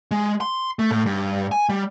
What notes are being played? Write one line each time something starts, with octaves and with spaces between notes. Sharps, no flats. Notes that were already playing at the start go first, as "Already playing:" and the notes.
G#3
C6
A3
A2
G2
G#5
G3